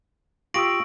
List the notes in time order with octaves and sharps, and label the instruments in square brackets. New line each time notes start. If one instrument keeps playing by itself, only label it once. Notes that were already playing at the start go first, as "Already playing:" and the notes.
[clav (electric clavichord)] F4 G4 [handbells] C#6 D#6 E6 [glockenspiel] A#6 D7 F#7